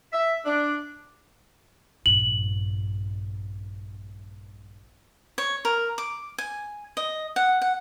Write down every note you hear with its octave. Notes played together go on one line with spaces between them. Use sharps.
E5
D4
A#1 G2 F#7
C#5
A#4
D6
G#5
D#5
F#5
F#5